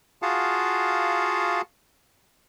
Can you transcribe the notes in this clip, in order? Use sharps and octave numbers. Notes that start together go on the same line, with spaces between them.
F4 F#4 G#4 F5 F#5 A5